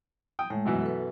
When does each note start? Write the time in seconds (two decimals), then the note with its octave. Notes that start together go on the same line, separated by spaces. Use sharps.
0.39 G5 D#6
0.50 A2 G#3
0.65 F#2 B2 E3
0.82 A4 B4